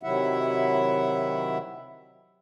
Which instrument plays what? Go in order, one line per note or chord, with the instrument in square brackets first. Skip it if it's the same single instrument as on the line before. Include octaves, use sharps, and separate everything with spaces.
[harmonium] C3 D#3 F#3 E4 E5 F#5